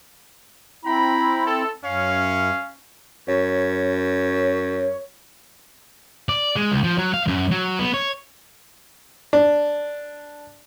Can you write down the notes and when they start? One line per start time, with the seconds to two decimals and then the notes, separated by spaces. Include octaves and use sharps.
0.85 C4 E4 G5 A#5 B5
1.45 A4
1.84 F#2 C#4 C#5 F5
3.28 F#2 C#5
6.29 D5
6.56 G#3
6.72 C#2
6.84 F3
6.98 F#3
7.14 F5
7.28 F#2
7.51 F#3
7.79 B3
7.94 C#5
9.33 D4